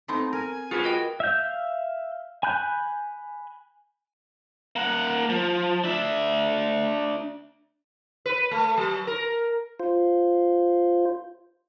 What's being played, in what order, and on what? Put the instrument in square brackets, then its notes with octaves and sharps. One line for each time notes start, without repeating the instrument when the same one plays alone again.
[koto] A3 B3 C4 [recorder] D#4
[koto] A#4 [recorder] G#5
[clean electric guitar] F4 F#4 B4 [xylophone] G#4 [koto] C#5
[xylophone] A#4 D#5 G5
[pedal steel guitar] E5 F5 G6
G#5 B5 F#6 G6
[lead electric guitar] A#3 F#5
F3
D4 E5
[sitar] B4
A3
F#3
A#4
[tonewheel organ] F4 C5